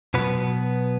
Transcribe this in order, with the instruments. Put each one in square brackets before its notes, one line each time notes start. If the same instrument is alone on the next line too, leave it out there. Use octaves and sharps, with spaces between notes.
[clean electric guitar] B2 F#3 B3 B4